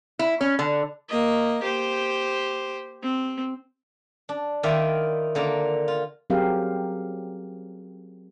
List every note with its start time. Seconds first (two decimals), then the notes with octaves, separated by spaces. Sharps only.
0.19 E4
0.41 C#4
0.59 D3
1.09 A#3 D#5
1.62 G4 C5
3.03 C4
4.29 D4
4.63 D#3 E4 F4 D5 E5 G5
5.35 D3 A#3 F4 A#4
5.88 F4
6.30 F#3 C4 G4 G#4 A#4 F5